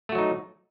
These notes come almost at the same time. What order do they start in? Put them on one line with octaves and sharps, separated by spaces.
A3 F#4 F#3 D#4